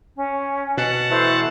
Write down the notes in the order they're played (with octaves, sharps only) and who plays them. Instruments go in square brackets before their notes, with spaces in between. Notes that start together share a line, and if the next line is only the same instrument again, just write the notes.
[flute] C#4
[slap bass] B2 [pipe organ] F#5 A5
[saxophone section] E3 A3 [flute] C5